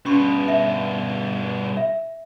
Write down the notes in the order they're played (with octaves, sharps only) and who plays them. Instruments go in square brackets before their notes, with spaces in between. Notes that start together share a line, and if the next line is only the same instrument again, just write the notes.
[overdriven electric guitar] G2 B2 [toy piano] C#4 C6 C#6
[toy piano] E5
E5